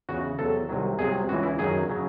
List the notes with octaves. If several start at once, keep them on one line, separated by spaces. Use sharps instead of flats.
E2 C#3 E3 F#4
E2 C3 F#3 A4
C2 C3 D#3 F#3
C2 C3 F#3 G#4
C#2 C#3 E3 F#4
E4
F#2 D#3 F#3 G#4
C#3 F#3